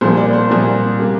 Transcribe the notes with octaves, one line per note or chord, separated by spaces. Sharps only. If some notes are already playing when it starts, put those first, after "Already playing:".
C2 A#2 F3 A#3 C5
D5
C5
C2 A#2 F3 A#3
C3 G3 A#3